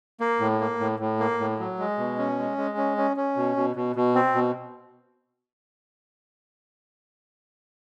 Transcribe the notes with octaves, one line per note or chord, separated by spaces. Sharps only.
A#3
A2
A#3
A2
A2
A#3
A2
F#3
G#3
B2
C#4
G#3
G#3
C#4
C#4
C#4
B2
B2
B2
B2
C4
B2